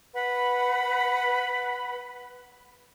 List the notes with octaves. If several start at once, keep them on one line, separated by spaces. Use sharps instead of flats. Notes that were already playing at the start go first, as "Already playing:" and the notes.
B4 F#5 B5